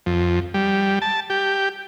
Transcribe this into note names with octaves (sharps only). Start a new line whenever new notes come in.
F2
G3
A5
G4